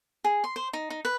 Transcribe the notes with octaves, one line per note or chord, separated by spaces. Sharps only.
G#4
C6
C5
D#4
D#4
B4